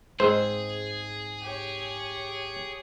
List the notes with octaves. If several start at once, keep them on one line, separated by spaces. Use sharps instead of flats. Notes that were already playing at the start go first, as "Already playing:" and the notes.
G#2 C4 G#4 C5
G4 C#5